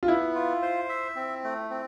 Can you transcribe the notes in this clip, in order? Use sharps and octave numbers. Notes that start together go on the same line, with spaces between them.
F4
B3 E4
F4
C5
E5
C4
A3
C4